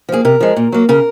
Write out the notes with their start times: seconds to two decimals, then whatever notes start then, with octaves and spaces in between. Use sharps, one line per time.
0.09 F3 A#3 G#4
0.25 C3 A#4
0.40 F3 G#3
0.57 A#2
0.72 F#3 A#3
0.89 C#3 A#4